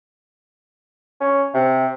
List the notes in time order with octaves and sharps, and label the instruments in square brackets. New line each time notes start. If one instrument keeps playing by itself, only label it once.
[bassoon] C#4
C3